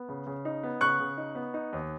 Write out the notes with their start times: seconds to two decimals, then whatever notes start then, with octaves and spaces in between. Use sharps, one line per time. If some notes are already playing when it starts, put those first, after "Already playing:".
Already playing: B3
0.09 C#3
0.27 C#3
0.45 D#4
0.63 B3
0.81 C#3 C#6 F#6
0.99 C#3
1.17 D#4
1.35 B3
1.54 D#4
1.73 D#2